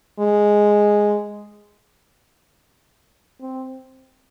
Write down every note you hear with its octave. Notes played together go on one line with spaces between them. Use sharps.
G#3
C4